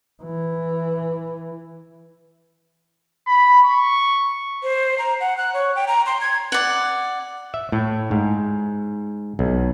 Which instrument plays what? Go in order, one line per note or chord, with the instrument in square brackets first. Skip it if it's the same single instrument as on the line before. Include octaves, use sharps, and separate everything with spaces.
[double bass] E3
[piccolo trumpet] B5
C#6
[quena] C5
A#5
F#5
F#6
C#5
G5
A#5
C6
G#6
[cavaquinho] D5 F#5
[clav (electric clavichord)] E5
A2
G#2
B1